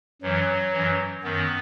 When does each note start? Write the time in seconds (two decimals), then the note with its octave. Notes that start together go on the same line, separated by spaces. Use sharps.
0.22 F#2 E3 F#3
0.72 F#2 E3
1.23 F#2 D#3 B3